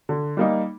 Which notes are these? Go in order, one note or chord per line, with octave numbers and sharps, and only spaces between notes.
D3
G3 A#3 D#4